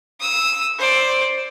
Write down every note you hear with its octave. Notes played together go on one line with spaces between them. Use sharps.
D#6 E6
C5 D5